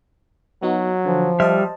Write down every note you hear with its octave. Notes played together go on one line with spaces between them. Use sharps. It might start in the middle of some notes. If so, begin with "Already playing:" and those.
F#3 B3 D#4 F#4
D3 F3
G3 C5 D#5 E5 A5 F6